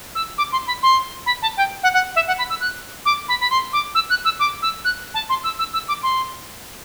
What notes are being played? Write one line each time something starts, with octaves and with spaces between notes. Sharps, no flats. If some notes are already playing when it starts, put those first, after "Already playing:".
E6
D6
C6
B5
C6
B5
A5
G5
F#5
F#5
E5
F#5
B5
E6
F#6
D6
B5
B5
C6
D6
E6
F#6
E6
D6
E6
F#6
A5
C6
E6
E6
E6
D6
C6